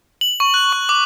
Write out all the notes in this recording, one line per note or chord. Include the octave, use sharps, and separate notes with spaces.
F#7
C#6
F#6
C#6
D6